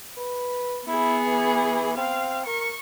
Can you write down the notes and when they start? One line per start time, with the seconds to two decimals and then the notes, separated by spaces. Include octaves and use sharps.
0.17 B4
0.87 B3 E4 G#4
1.28 E3
1.97 C4 F5
2.47 A#4 C#6